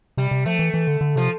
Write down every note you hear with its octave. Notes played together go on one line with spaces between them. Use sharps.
C3 G3
C3
F3 A3
E3
E3
D3
D3
C3 F3